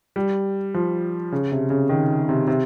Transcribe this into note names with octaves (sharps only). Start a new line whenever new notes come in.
G3
F3
C#3
C3
C#3
D#3
C3
C3